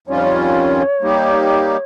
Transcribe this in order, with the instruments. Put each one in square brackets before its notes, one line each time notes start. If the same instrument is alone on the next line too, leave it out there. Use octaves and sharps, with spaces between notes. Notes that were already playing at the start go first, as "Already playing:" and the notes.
[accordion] F2 D#3 G3 C#4 F4 [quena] C#5
[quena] C5
C#5
[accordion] G3 A#3 D#4 G4